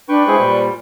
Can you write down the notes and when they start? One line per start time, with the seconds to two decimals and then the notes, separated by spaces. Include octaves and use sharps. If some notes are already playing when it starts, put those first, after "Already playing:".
0.09 D4 B4 G5 C#6
0.28 G#3 E4 G#4 C5
0.40 A#2 G3